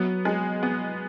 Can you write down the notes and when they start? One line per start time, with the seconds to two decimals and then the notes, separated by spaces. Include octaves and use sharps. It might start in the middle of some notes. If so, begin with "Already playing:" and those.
Already playing: F#3 B3
0.25 G#3
0.63 B3